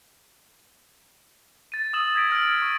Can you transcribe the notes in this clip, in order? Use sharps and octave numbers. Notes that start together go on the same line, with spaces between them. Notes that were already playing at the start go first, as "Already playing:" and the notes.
A6 D#7
D#6 E6 E7 F#7
D#6 G#6 A#6 B6 D7
E6 F6 A6 D7
C#6